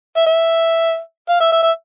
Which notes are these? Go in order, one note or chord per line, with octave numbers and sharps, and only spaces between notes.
E5
E5
F5
E5
E5
E5